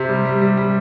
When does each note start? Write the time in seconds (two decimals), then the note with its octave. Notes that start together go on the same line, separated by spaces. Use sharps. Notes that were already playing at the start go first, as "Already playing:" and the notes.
Already playing: C3
0.09 G3
0.25 G3
0.41 G3
0.57 G3